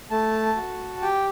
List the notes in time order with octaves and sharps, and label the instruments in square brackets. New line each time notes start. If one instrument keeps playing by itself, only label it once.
[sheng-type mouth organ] A3 A5
F#4
G4 G5